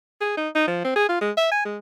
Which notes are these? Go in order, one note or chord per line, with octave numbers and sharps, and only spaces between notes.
G#4
D#4
D#4
F3
C4
G#4
F4
G#3
E5
G#5
G#3